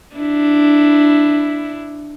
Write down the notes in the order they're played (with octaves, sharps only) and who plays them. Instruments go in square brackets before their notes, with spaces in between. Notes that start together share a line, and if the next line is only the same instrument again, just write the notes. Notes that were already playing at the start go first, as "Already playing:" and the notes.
[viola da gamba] D4 E4